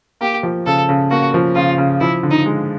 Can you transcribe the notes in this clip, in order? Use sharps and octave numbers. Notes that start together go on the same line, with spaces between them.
A#3 G4
F3
C#3 A4
C#3
A#3 F#4
F3
C#3 F4
C#3
F3 E4
D3
D#4
G#3